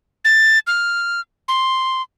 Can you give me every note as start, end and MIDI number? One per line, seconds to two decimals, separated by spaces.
0.25 0.59 93
0.67 1.20 89
1.48 2.02 84